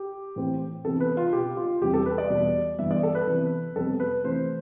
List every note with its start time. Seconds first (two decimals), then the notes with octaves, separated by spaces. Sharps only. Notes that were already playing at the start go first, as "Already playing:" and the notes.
Already playing: G4
0.36 A2 E3 A3 C4
0.85 C3 E3 B3 A4
1.00 B4
1.17 F4
1.33 B2 B3 G4
1.57 F4
1.81 E2 C3 E3 G3 G4
1.94 A4
2.06 B4
2.18 D5
2.30 E2 B2 G3
2.78 G2 E3 B3 E5
2.91 D5
3.03 A4
3.15 B4
3.27 C3 E3 B3
3.76 F2 C3 G3 B3 A4
4.00 B4
4.24 C3 E3 A3 C5